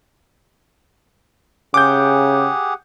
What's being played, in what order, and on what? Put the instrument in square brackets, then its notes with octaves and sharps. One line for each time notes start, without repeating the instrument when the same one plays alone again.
[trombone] C#3 [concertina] G4 G#4 F#5 [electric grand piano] D6 G6